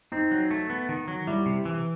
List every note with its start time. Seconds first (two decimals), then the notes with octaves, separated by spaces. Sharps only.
0.12 C4 D#4
0.31 F#3
0.51 A3
0.70 B3
0.89 D#3
1.08 F#3
1.27 G3 E4
1.46 C3
1.65 E3